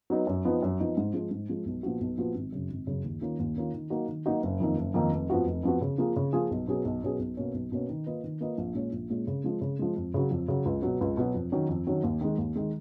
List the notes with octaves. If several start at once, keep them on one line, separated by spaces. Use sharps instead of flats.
F#3 B3 D#4
F#2
F3 B3 D#4
F#2
F3 B3 D#4
G#2
F3 G#3
G#2
F3 G#3
B1
A#2 F3 B3 F#4
B1
A#2 F3 B3 F#4
G#1
F#2 C#3
G#1
F#2 C#3
D#2
D#3 A#3 C#4 F4
D#2
D#3 A#3 C#4 F4
D#3
F#3 A#3 D#4 F#4
D#3
F#3 A#3 D#4 F#4
F#1
F2 D#3 A#3 D#4
F#1
F2 D#3 A#3 D#4
F1
F2 F3 B3 F#4
F1
F2 F3 B3 F#4
C#3
F3 A#3 F4 G#4
C#3
F3 A#3 F4 G#4
B1
B2 F#3 C#4 G#4
B1
B2 F#3 C#4 G#4
B1
B2 A#3 C#4
B1
B2 A#3 C#4
D#3
A#3 F4 B4 D#5
D#3
A#3 F4 B4 D#5
A#1
A#2 G#3 C#4
A#1
A#2 G#3 C#4
C#3
F3 G#3
C#3
F3 G#3
F2
C#3 F#3
F2
C#3 F#3
C#2
B2 F#3
C#2
B2 F#3
F2
D#3 F#3 C#4
F2
D#3 F#3 C#4
D#2
D#3 G#3
D#2
D#3 G#3